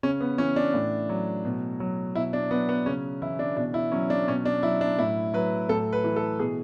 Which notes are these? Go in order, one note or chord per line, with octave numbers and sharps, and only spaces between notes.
C#3 C#4
B3
E3 C#4
D4
A2
F#3
B2
F#3
B2 E4
D4
F#3 B3
B3
C#3 C#4
E3 E4
D4
B2 D4
E4
F#3 C#4
D4
B2 C#4
D4
F#3 E4
D4
A2 E4
F#3 B4
A2 A4
B4
E3
A4
B2 G#4